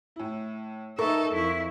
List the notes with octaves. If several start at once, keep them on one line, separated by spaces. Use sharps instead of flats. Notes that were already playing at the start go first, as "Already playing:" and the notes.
A2 E4
D#4 A4 A#4 E5 C#6
F2 E4